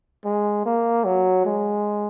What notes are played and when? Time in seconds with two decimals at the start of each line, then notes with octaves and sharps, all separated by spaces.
0.24 G#3
0.66 A#3
1.05 F#3
1.45 G#3